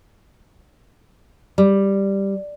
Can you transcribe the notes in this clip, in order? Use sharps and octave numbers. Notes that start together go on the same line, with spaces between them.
G3